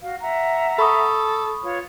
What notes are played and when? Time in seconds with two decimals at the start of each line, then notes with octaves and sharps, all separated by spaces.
0.01 F#4 F5
0.21 E5 F#5 A#5
0.79 A4 B5 C#6 D#6
1.63 F4 B4 C#5